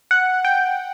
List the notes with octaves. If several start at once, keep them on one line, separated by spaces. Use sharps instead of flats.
F#5
G5